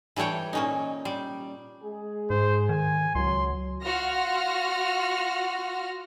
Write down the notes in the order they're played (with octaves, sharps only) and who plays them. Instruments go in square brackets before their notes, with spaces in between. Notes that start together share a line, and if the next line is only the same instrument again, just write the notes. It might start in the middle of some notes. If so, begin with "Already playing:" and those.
[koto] E3 G3 A4 C#5 G5
A#2 C#4 D#4
G3
[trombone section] G#3 G#4
[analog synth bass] G#2 [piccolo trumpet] C5
[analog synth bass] D#3 [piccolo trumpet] G#5
[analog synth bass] C#2 [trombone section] F#3 [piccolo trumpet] C6
[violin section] F4 F#4 F6 A#6